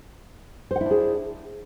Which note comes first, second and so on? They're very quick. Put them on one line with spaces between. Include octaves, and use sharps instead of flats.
C5 F#5 E4 D4 G#4